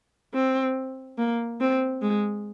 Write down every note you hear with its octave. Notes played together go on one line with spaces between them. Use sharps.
C4
A#3
C4
G#3